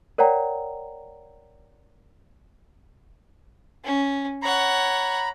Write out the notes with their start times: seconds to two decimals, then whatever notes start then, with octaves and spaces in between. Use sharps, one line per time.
0.18 A#4 C#5 D5 F#5 G5 A#5
3.84 C#4
4.42 C#5 F#5 A#5 B5